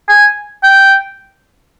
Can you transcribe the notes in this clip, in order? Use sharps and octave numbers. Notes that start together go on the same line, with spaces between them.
G#5
G5